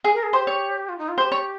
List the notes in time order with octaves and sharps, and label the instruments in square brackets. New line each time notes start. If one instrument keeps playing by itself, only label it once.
[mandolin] G#4
[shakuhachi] A#4
G#4
[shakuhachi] G4 [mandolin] C5
[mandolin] C#5
[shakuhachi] F4
D#4
F4
[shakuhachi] G4 [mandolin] C5
[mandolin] C#5